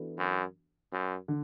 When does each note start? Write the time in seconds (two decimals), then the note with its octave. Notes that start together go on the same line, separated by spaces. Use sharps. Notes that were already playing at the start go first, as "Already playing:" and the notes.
Already playing: E3 B3 D4 F#4 A4
0.18 F#2
0.92 F#2
1.28 D3